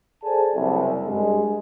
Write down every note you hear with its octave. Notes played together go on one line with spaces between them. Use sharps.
G#4 A4 C5 D5 G#5 A5
F#1 C2
G2 G#3